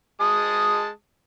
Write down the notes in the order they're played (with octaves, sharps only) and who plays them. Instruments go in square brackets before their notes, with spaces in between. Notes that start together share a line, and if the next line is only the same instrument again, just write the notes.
[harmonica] G#3 A5 D#6